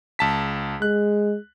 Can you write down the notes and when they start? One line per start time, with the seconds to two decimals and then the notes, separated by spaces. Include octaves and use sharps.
0.19 C#2 A5 B6
0.82 G#3 F#6